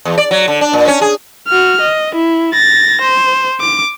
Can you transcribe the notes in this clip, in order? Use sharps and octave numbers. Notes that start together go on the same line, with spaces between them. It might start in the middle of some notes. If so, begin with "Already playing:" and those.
E2
D5
F#3
D3
D4
A#2
C#4
G#4
F#4 F6
D#5
E4
A6 A#6
C5
D6